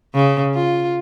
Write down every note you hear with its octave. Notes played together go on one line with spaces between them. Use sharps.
C#3
F4